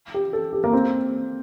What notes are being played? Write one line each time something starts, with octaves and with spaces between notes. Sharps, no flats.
G4
A4
G4
A#3
C4